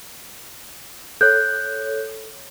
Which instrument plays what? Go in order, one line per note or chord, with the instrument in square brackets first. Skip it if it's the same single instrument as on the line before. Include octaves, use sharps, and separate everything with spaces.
[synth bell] A4 C#5 [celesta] F#6 G6